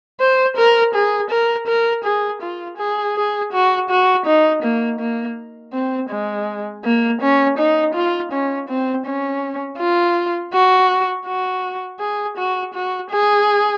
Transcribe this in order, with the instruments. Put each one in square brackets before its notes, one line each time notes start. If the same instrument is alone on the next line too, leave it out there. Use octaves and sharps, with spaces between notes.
[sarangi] C5
A#4
G#4
A#4
A#4
G#4
F4
G#4
G#4
F#4
F#4
D#4
A#3
A#3
C4
G#3
A#3
C#4
D#4
F4
C#4
C4
C#4
F4
F#4
F#4
G#4
F#4
F#4
G#4